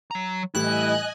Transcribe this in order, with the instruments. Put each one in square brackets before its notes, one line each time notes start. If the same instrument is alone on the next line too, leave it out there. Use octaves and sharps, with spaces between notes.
[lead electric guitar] F#3 A#5
[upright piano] A2 E3 G3 [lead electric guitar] E4 [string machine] D#5 G#5 [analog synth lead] F#6